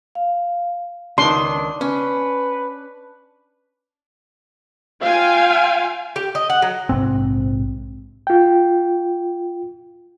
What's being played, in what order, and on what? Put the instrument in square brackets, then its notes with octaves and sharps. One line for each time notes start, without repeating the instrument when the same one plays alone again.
[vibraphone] F5
[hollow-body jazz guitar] C#2 D#3 [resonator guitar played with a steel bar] D4 [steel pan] C6
[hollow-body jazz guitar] C#4 [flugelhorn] B4
[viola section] F4 F5 G5 G#5
[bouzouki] G4
D#5
F#5
F#3
[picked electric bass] A#1 G#2 C3 C4
[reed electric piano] F4 G5